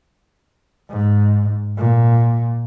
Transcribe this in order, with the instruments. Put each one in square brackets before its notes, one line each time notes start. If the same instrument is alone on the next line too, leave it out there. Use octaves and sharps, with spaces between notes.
[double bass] G#2
A#2